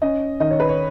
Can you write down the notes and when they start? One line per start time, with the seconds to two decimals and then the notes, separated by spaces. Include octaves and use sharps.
0.02 C#4 D#5
0.40 D#3 D#5
0.51 C#5
0.60 B4
0.69 C#5